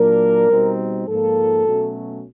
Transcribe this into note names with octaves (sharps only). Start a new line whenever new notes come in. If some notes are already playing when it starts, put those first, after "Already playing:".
Already playing: A#2 F#3 A#3 D4 A#4
B2 G3 C4 D#4
G#2 F3 A#3 A4
B2 F#3 A3 C#4